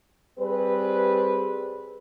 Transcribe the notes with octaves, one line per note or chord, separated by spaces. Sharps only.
G3 C4 G#4 B4